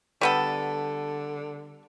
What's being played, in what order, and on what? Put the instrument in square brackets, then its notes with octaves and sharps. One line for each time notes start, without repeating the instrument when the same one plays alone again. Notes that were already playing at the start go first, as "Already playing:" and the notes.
[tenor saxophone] D3 [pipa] G3 B3 A4